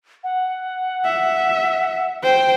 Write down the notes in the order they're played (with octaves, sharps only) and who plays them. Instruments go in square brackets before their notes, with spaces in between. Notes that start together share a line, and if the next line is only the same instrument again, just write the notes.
[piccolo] F#5
[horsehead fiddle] E5
C5 G5